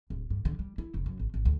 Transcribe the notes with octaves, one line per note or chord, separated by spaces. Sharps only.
D1
G2
D3
G3
E4
F1
F#2
G#1
G#1
D2